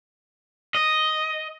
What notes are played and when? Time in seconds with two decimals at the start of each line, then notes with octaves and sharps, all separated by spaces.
0.75 D#5